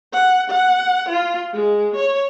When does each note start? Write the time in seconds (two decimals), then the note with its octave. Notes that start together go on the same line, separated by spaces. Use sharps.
0.13 F#5
0.50 F#5
1.09 F4
1.53 G#3
1.96 C#5